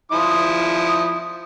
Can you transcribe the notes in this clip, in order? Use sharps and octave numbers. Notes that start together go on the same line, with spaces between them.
F3 E4 D#6